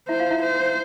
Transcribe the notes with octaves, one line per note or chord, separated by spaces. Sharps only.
E4 C5 E5
F4 F5
E4 E5
C5